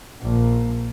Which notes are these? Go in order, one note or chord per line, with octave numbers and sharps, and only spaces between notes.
A#1 A#3